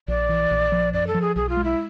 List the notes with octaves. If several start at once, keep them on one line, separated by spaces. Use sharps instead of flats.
A#1 D5
E3
A#1
F3
F#2 D5
A4
F3
G#4
B1 G#4
F4
G#3
E4